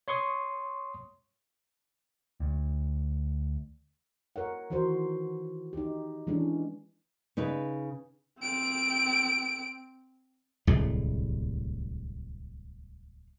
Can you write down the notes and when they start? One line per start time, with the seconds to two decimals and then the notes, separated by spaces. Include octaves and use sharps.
0.08 C#5 C6 C#6 D#6
2.40 D2
4.36 A#4 C#5 F#5
4.70 D#3 E3 F#4 A#4 C5
5.73 D#4 G4
6.27 E3 G#3 C#4 D4
7.37 C#3 D#4 B4
8.40 C4 D7
10.67 D1 C2 A2 G#3